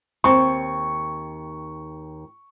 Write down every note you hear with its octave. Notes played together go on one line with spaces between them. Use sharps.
D#2 C4 C#6